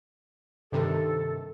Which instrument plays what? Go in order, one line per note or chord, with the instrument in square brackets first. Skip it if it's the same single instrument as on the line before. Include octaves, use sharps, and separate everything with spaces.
[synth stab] G2 C3 D#3 [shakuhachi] A4